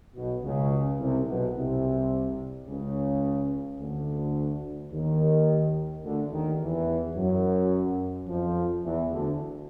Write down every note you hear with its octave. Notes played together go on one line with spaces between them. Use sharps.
B1 B2
C#2 C#3
C2 C3
B1 B2
C2 C3
C#2 C#3
D2 D3
D#2 D#3
D2 D3
D#2 D#3
E2 E3
F#2 F#3
F2 F3
E2 E3
D2 D3